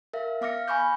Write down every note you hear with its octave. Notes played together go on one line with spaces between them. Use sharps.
A#4 E5 F5
B3 F5 D6 F6 A#6 C#7
G#5 B5 C#6 D6 G6